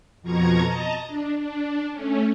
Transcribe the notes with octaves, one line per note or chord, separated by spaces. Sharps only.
F2 B2 F3 A#5 C#6 G#6
D#5 A5 A#5
D4
D4
A3 C#4